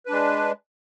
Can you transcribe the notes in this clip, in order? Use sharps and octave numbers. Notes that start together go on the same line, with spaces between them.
G#3 D4 B4